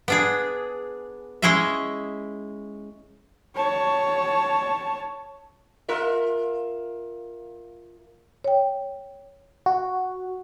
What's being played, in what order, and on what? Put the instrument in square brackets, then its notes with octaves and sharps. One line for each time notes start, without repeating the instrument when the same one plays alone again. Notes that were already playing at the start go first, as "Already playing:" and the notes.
[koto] B3 D4 G#4
G#3 C#4 E4 G#4 D#5 E5
[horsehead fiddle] C#5 A5
[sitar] F4 A#4 E5
[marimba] C#5 G5
[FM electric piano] F#4